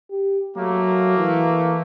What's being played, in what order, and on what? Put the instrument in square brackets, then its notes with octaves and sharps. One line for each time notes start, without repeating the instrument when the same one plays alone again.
[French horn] G4
[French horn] F#3 [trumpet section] A3 A#3
[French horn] E3